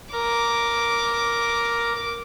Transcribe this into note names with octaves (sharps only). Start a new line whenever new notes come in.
A#4 D6